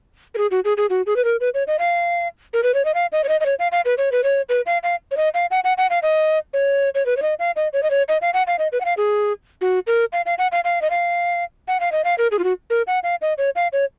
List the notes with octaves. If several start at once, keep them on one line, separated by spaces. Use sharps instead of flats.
A#4
G#4
F#4
G#4
G#4
F#4
G#4
B4
A#4
B4
C#5
D#5
F5
A#4
B4
C#5
D#5
F5
D#5
C#5
D#5
D#5
C#5
F5
F5
B4
C#5
B4
C#5
B4
F5
F5
C#5
D#5
F5
F#5
F#5
F#5
F5
D#5
C#5
C#5
B4
C#5
D#5
F5
D#5
C#5
D#5
C#5
D#5
F5
F#5
F5
D#5
B4
F#5
F5
G#4
F#4
A#4
F5
F5
F#5
F5
F5
D#5
F5
F#5
F5
D#5
F5
A#4
G#4
F4
F#4
A#4
F#5
F5
D#5
C#5
F5
C#5